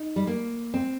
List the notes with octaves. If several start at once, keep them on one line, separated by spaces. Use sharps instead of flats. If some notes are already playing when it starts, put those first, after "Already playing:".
Already playing: D#4
G3
A#3
C4